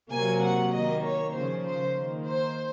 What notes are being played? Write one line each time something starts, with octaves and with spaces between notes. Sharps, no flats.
C3 F#3 A#3 G#5
F#5
D#3 A#3 D#5
C#5
C#3 F3 A#3 C5
C5
D#3 A#3
C5